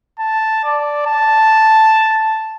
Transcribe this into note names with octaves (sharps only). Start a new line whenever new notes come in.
A5
D5
A5